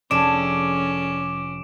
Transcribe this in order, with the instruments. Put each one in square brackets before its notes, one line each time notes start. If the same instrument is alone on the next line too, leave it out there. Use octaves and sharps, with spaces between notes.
[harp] F1 [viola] C#4 [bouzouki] D4 G#4 A4 [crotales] D6 D7 E7